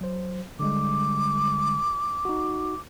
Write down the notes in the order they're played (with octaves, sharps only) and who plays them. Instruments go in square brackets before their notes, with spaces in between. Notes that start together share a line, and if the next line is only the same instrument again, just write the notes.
[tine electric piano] F#3 C5
[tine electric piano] D3 G3 G#3 [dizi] D6
[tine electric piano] D#4 F#4